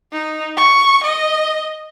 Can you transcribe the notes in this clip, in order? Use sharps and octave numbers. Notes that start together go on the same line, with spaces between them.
D#4
C#6
D#5